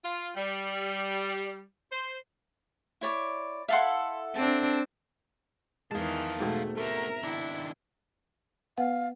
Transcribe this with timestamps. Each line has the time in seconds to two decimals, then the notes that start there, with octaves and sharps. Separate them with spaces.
0.03 F4
0.35 G3
1.91 C5
3.01 E4 C#5 D5
3.68 E4 A4 F5 F#5 A5 C6
4.36 C4 D4 A5
5.91 E2 D#3 E3 G#3 G#4 F5 A5
6.40 G#2 B2 A3 C4
6.78 D3 A3 A#4 E5 A#5
7.24 D#3 D4 E4
8.78 B3 B4 F5 F#5